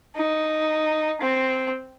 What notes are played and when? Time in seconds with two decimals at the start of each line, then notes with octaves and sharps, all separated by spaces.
0.16 D#4
1.21 C4